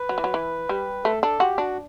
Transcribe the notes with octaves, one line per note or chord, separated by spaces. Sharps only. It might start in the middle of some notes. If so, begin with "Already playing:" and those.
Already playing: B4
F#3
E3
F#3
E3
G3
A3 A4
D4 A4
F#4 G4
D4 F#4